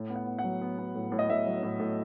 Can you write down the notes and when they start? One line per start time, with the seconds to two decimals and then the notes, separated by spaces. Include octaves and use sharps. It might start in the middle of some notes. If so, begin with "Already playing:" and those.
Already playing: A2
0.10 B3
0.16 F#5
0.27 B3
0.39 F#5
0.44 F#3
0.61 B3
0.79 B3
0.95 A2
1.12 A2
1.19 D#5
1.29 A2 E5
1.46 F#3
1.63 A2
1.80 A2